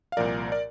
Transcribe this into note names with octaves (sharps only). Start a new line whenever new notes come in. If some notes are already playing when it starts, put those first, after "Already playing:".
F5
C2 A#2 F3 A#4 D5
D5